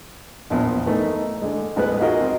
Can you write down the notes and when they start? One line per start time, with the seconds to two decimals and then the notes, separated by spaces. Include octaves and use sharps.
0.50 A#1 E2 A#2 F3
0.86 E3 A3 A#3 D#4
1.42 D3 G#3
1.76 A1 E2 G#3 B3 B4 F#6
2.01 D#4 F4 F#4 G#4 A#4 D#5
2.21 C4